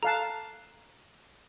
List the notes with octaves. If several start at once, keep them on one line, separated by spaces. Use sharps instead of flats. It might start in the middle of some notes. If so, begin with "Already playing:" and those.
A4 F5 A5 A#5 F#6